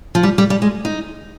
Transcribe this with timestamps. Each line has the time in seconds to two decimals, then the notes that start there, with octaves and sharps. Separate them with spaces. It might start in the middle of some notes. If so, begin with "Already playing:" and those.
0.15 F3
0.23 G3
0.38 G3
0.50 G3
0.62 G#3
0.85 D#4